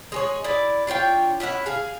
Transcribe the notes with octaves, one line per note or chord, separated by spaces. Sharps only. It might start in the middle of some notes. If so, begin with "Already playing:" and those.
G#3 G#4 C#5
E4 D5
D4 F4 C#5 G5
C#4 E4 E5 F#5
G#4 F5 G#5